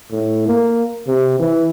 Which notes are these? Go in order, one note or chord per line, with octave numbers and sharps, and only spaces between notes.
A2
A#3
C3
E3